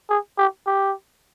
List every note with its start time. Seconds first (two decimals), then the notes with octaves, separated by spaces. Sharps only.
0.10 G#4
0.38 G4
0.67 G4